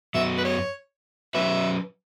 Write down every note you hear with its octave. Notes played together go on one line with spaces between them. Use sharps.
F#2 F#3 B3 F#4 E5
B4
C#5
F#3 C#4 F#4 B4 E5